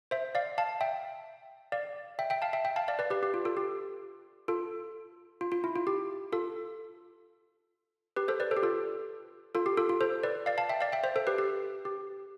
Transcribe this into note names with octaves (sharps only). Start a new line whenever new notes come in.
C5 E5
D5 F5
F5 A5
E5 G5
D5 F5
E5 G5
E5 G5
F5 A5
E5 G5
E5 G5
F5 A5
D5 F5
B4 D5
G4 B4
G4
F4
F4 A4
G4
F4 A4
F4
F4
E4
F4
G4
F4 A4
G4 B4
A4 C5
B4 D5
A4 C5
G4
F4 A4
F4 A4
G4
F4 A4
F4
A4 C5
B4 D5
D5 F5
F5 A5
E5 G5
D5 F5
E5 G5
C5 E5
A4 C5
G4 B4
G4
G4